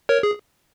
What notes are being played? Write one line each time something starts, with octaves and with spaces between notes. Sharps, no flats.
A#4 C#5
G#4